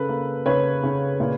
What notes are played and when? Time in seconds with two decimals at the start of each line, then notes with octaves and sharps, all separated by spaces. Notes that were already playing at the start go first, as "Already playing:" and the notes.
Already playing: C#3 A4 B4
0.09 A#3
0.46 C#3 B4 C#5
0.83 C#3
1.20 A#2